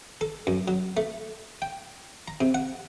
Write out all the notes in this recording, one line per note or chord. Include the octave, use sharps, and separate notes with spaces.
A4
F#2
F#3
A3
G5
A#5
C3
F#5